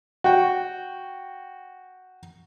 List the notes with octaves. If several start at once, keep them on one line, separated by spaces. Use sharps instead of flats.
F#4 G5